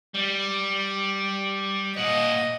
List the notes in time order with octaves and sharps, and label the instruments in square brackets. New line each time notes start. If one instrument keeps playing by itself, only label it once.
[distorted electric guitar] G3
[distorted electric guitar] A#2 F#5 [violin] D#5